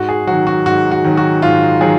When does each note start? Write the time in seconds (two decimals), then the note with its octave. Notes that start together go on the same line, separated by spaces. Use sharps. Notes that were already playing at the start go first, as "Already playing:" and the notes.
Already playing: G#2 F#4
0.09 G#4
0.27 D#3 F#3 F#4
0.47 F#4
0.66 G#2 F#4
0.91 F#4
1.04 D#3 F#3
1.17 F#4
1.42 G#2 F4
1.81 D#3 F#3 G#4